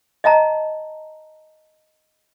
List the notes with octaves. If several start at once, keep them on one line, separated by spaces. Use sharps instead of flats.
D#5 E5 A5 A#5